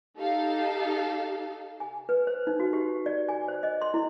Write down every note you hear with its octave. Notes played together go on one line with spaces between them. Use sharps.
D#4 G4 A4 F5
G#5
B4
C5
D#4
F#4
G4
D5
G#5
C5
D#5
C6
E4